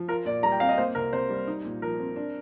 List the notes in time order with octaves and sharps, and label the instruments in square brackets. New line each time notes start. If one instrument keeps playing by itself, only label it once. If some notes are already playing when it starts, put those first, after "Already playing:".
Already playing: [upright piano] F3
[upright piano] F4 [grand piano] A#4
[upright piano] A#2 [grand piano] D5
[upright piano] G3 [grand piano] A#5
[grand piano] G5
[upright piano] C4 [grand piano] F5
[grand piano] D#5
[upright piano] A#3 [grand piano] C5
[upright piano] C2 [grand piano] A#4
[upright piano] C3 [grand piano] C5
[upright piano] G3
D#4
A#2
[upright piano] F3 [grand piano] A#4
[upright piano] C4
D4